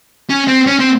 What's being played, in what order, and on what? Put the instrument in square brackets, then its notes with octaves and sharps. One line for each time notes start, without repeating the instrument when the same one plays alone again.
[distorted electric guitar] C#4
C4
C#4
C4